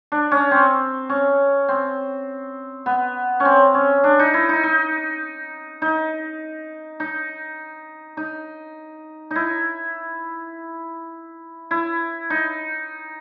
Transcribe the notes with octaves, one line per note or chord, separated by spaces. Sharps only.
D4
C#4
C4
C#4
C4
B3
C4 C#4
C#4
D4
D#4
E4
D#4
D#4
D#4
D#4
D#4
D#4 E4
E4
D#4